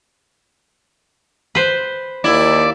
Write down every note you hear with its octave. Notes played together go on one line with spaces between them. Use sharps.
B4 C5
D#2 E4 D5